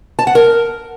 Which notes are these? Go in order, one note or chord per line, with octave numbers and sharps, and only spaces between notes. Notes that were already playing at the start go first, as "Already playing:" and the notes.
A5
F#5
A#4